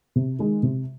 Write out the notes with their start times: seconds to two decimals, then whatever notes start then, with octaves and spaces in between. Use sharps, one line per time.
0.16 C3
0.39 D#3 G#3
0.63 C3